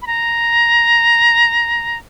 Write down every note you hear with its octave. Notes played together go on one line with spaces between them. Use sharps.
B5
A#5